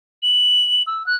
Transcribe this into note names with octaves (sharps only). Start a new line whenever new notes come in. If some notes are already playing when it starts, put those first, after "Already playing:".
F#7
E6
F#6